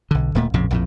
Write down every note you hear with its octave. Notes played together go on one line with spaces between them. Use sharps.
B1 D3
D1 A#2 A3
A#1 F2 A2 C#3
A#1 F2 A2